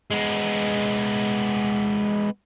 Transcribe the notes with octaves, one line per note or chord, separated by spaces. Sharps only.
G#3 B3